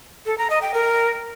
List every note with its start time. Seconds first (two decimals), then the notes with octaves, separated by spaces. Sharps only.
0.26 A4
0.38 A#5
0.50 D#5
0.62 G5
0.74 A#4